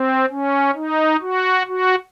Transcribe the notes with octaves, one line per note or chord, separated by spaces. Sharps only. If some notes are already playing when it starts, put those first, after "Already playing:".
Already playing: C4
C#4
D#4
F#4
F#4